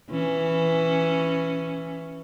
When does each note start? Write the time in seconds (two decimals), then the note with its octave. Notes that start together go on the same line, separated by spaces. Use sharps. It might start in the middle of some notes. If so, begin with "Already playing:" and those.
0.11 E3 C#4